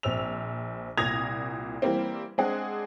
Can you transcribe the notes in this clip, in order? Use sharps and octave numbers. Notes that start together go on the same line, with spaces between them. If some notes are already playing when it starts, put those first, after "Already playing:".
A#1 C4 E6 F7
C2 A#2 D#6 G#6 A#6 F7
E3 G3 A#3 C4
G#3 C4 D4 G#4 F#5